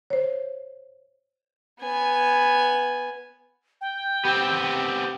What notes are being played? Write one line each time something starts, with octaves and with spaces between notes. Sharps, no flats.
C5 C#5
B3 G#5
G5
B3 C4 G4